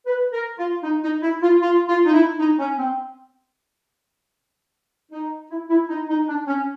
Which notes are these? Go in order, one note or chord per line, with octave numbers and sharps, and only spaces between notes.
B4
A#4
F4
D#4
D#4
E4
F4
F4
F4
D#4
E4
D#4
C#4
C4
D#4
E4
E4
D#4
D#4
D4
C#4